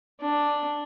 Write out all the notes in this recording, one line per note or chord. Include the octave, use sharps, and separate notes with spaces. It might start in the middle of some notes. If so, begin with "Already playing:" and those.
D4